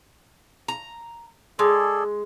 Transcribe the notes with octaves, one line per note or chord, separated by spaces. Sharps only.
A#5
G#3 G#4 A4 D5